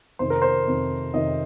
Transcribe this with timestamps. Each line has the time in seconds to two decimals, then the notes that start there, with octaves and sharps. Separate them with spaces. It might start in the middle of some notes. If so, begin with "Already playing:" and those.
0.19 F2 C3 D#3 C5
0.30 A#4
0.42 C5
0.67 F2 C3 D#3
1.14 F2 C3 D#3 D#5